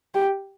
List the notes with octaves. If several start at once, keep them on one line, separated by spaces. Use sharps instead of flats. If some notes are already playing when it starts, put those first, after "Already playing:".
G4